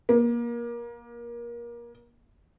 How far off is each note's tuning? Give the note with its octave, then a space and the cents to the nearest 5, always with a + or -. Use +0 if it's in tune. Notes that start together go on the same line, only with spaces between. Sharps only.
A#3 +25